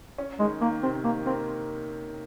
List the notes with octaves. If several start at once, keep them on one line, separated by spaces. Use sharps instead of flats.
C#4
D#3 G#3
D#3 A#3
C3 C4
D#3 A#3
A#3 C4